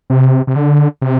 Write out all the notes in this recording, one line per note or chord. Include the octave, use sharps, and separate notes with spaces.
C3
C3
D3
C3